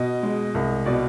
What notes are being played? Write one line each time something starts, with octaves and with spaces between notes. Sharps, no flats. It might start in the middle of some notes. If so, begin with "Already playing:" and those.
Already playing: B2 D#5
G#3
C2
B2 D5